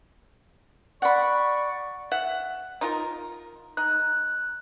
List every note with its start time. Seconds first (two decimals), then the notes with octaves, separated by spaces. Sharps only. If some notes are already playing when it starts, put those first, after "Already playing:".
1.02 D5 F#5 B5 C#6
2.12 E5 F#5
2.81 D#4 F4 A#4
3.77 D#4 F#6